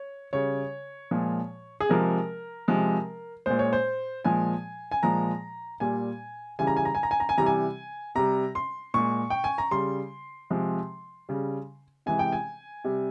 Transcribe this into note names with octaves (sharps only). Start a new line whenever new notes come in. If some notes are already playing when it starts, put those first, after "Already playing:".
Already playing: C#5
C#3 G3 C#5
A#2 F3 G#3
G#4
C3 F3 G#3 A#4
C3 F3 G#3
A#2 G#3 C5
C#5
C5
A#2 F3 G#3 G#5
G#5
A#2 F3 G#3 A#5
A#2 G3 G#5
C#3 E3 G3 G#5
A#5
G#5
A#5
G#5
A#5
G#5
A#5
G#5
C3 E3 G3 A#5
G#5
C3 G3 A#5
C6
A#2 G#3 C#6
G5
G#5
A#5
C#3 G3 C6
C3 F3 G#3
C#3 G3
C3 E3 G#3 G#5
G5
G#5
C3 G3